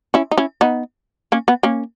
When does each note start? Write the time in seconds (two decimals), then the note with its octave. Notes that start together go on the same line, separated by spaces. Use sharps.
0.14 C#4 E4
0.31 D#4
0.38 C#4 E4
0.61 B3 D#4
1.32 A#3 C#4
1.48 B3
1.63 A#3 C#4